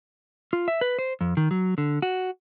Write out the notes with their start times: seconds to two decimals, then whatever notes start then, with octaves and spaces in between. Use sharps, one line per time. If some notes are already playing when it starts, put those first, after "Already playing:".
0.53 F4
0.68 E5
0.81 B4
0.99 C5
1.21 F2
1.37 D#3
1.51 F#3
1.78 D3
2.02 F#4